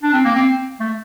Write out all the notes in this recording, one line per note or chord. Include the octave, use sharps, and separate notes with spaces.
D4
C4
A#3
C4
A3